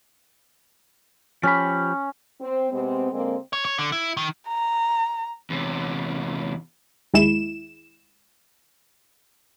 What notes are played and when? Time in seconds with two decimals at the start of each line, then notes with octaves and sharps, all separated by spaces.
1.43 F3 C#4 G4 B5
2.40 C4
2.71 C3 G#3 B3 C4
3.12 D3 G#3 A#3 C4
3.53 C#5
3.65 C#5
3.78 D3
3.92 E4
4.17 D#3
4.48 A#5
5.50 E2 C3
7.14 D#2 G#3 E4 E7